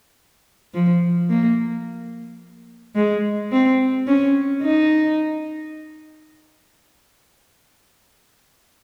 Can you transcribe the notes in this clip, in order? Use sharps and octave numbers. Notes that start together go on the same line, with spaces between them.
F3
A#3
G#3
C4
C#4
D#4